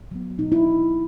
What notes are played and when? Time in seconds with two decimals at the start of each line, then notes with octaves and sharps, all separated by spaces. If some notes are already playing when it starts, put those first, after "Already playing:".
0.11 F#3 B3
0.38 B2 D#4
0.52 E4